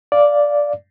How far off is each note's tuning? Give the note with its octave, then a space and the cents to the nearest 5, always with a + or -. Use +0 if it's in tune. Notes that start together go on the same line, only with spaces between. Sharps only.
D5 -5 F5 +0